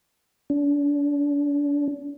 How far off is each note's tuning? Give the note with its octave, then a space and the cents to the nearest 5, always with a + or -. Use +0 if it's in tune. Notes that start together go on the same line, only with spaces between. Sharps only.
D4 -35